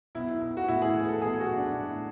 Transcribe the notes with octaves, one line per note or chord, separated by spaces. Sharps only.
B1 E4
B1
F#4
A2 E4
G#4
E3
A4
B1 G#4
F#4
B1
D4
A2